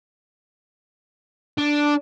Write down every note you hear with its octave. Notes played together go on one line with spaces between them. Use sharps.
D4